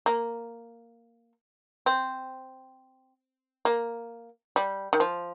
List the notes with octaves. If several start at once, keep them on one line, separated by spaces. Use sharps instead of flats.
A#3
C4
A#3
G3
D#3
F3